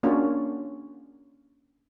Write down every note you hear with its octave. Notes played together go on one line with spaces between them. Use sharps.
A#3 C#4 D4 F4 F#4